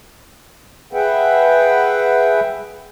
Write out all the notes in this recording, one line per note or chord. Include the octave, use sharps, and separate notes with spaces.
G#4 B4 E5 F#5 G5